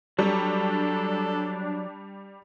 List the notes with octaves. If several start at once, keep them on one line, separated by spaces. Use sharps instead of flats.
F#3 G3 D4 A4